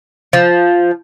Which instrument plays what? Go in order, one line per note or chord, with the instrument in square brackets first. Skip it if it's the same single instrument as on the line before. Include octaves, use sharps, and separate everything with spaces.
[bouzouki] F3